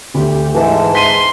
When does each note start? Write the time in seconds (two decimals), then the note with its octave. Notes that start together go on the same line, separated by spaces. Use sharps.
0.14 D2 G4
0.55 G#2 E3 A5
0.95 E5 C6 B6 D#7